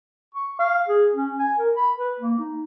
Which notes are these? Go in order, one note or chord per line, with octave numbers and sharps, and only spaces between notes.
C#6
F5
G#4
C#4
G#5
A#4
B5
B4
A#3
D#4